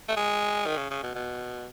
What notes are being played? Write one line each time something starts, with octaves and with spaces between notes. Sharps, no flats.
A3
G#3
D#3
C#3
C#3
B2
B2